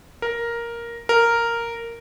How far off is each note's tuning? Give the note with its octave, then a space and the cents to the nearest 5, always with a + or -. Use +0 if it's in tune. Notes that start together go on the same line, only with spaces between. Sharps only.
A#4 +5
A#4 -5